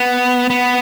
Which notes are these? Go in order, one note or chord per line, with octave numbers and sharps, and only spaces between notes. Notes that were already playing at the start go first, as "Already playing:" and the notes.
Already playing: B3
B3